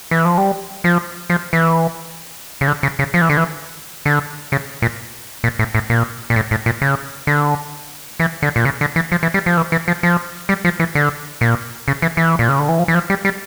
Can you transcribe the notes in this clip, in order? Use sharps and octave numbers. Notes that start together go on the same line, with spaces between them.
E3
F3
G3
F3
F3
E3
C#3
D3
C#3
C#3
F3
E3
D3
E3
D3
C#3
A#2
A#2
A2
A2
A#2
A#2
A2
A2
A#2
C#3
D3
E3
D3
A#2
C#3
D3
E3
F3
E3
G3
F3
E3
E3
F3
F3
G3
F3
E3
D3
A#2
C#3
E3
E3
A#2
C#3
D3
E3
F3
E3
F3
G3
G3